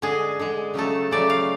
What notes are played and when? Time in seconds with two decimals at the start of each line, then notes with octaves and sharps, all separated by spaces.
0.02 D3 G#3 G#4
0.39 D3 G#3
0.74 C#3 F#3 A3 A4
1.11 C#3 F#3 A3 D5
1.30 F5